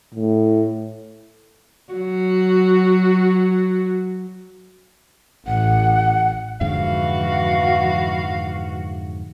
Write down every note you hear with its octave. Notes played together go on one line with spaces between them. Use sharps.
A2
F#3 F#4
A1 F#5
F2 G#2 D3 E3 F#4 F5